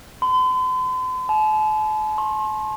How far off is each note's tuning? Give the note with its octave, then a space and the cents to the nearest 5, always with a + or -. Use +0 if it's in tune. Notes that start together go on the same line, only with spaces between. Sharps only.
C6 -45
A5 -40
C6 +45